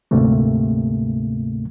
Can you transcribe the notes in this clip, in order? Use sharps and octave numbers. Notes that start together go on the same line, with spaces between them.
D2 G#2 C3 A3 A#3